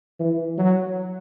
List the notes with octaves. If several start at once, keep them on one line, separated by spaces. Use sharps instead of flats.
E3
F#3